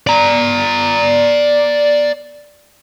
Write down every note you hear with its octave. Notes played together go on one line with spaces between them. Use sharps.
D5 A#5